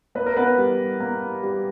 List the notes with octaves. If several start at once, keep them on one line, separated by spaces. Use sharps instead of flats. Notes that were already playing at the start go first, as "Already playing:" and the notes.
A#3 B4
A#4
B3 B4
G3
A#3
G3